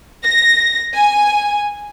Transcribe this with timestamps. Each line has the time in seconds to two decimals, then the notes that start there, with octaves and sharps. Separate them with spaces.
0.23 A#6
0.94 G#5